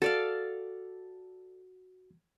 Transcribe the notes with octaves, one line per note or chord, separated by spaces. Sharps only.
F#4 A4 D5 F5